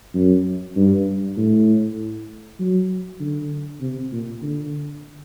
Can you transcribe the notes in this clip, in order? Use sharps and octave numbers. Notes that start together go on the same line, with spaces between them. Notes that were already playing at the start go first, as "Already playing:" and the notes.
F#2
G2
A2
F#3
D3
C3
A#2
D3